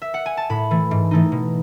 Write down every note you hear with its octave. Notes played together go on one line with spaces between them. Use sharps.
E5
F#5
G#5
A5
A2 B5
E3 A3
G#2
E3 A3 D#4
B2